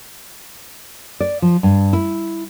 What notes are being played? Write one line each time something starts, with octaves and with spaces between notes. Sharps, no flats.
D5
F3
G2
E4